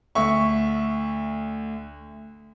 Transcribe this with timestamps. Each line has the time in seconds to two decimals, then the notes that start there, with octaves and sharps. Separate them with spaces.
0.15 D2 E5 C#6